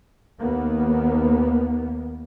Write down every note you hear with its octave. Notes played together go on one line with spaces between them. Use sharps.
D#2 A#3 B3